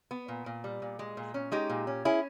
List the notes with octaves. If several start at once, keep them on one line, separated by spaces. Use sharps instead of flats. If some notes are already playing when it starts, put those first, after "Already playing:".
B3
A#2
A#2
G3
A#2
G#3
A#2
C#4
G#3 D#4 G4
A#2
C#4
C#4 E4 G#4